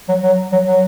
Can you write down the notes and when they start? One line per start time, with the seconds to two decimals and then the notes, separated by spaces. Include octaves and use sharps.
0.08 F#3
0.23 F#3
0.52 F#3
0.67 F#3